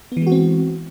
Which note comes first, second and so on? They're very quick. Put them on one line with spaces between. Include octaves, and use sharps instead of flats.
B3 E3 G#3 F#4 C4